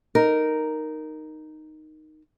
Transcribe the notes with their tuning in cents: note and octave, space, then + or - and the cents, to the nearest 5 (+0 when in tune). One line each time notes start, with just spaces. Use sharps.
D#4 -5 A#4 +0